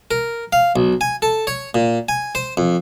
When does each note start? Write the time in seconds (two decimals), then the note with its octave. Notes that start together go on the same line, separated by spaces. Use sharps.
0.11 A#4
0.53 F5
0.76 B1
1.01 G#5
1.22 A4
1.47 C#5
1.75 A#2
2.09 G#5
2.35 C5
2.57 F2